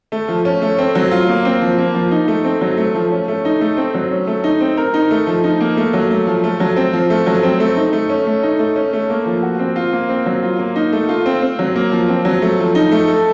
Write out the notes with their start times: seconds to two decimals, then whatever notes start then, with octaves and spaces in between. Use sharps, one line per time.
0.12 A3
0.28 F3
0.45 C#4
0.62 A3
0.78 C4
0.95 F#3
1.11 F4
1.29 A#3
1.45 C4
1.61 F3
1.78 A#3
1.95 F3
2.11 D#4
2.28 A3
2.44 C4
2.61 F#3
2.78 A3
2.95 F3
3.11 C#4
3.28 A3
3.45 D#4
3.61 A3
3.77 C4
3.94 F#3
4.11 C#4
4.27 A3
4.44 D#4
4.61 C4
4.77 A#4
4.94 D#4
5.11 A3
5.27 F3
5.44 D#4
5.60 A#3
5.77 A3
5.94 F#3
6.10 A3
6.27 F3
6.44 A3
6.60 F#3
6.76 C4
6.93 F3
7.10 A3
7.27 F#3
7.43 C4
7.60 A3
7.76 D#4
7.93 A3
8.10 C#4
8.27 A3
8.43 D#4
8.59 A3
8.76 C#4
8.93 A3
9.10 A#3
9.26 F3
9.43 F#4
9.59 C4
9.76 F4
9.93 A#3
10.09 C4
10.26 F#3
10.43 F4
10.59 A#3
10.76 D#4
10.92 A3
11.09 F4
11.26 C4
11.42 C4
11.59 F#3
11.76 A#3
11.92 F3
12.08 C4
12.25 F#3
12.42 A3
12.59 F3
12.75 D#4
12.92 A3
13.08 A4